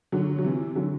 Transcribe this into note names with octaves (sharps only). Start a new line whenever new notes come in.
D3 F#3
F#3
C3 E3
D3 F#3